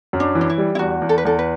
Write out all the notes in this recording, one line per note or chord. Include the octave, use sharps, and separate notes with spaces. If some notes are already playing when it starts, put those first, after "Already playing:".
F#2
D4
E3
D4
E4
G3
E4
E2 F#4
E2
A4
B4
E2 A4
B4